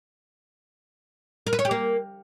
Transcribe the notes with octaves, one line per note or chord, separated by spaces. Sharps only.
A#4
B4
C#5
G4
A#3